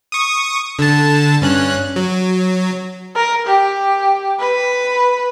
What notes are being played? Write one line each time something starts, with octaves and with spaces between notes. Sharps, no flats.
C#6 D#6
D3 A5
G2 C#4 F#6
F#3
A#4
G4
B4